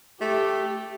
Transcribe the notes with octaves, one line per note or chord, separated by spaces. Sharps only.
A3 G4